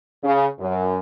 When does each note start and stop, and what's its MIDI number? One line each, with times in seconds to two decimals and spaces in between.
0.23 0.45 49
0.59 0.99 42